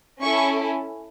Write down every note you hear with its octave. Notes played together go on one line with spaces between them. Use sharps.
C#4 E4 A4 C#6